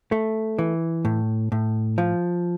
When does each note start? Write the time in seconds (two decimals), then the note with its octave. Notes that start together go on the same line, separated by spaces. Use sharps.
0.12 A3
0.59 E3
1.05 A2
1.52 A2
1.98 F3